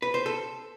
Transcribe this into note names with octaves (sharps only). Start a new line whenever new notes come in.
B4
C5
A4